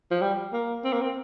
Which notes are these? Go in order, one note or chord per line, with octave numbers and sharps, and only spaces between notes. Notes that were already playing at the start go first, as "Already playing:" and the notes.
F3
G3
A#3
C4
A#3
C4